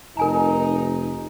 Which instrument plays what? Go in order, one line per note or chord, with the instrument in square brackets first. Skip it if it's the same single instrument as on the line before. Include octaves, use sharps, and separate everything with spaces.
[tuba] F1 [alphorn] D#4 [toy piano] A#4 G#5 A#5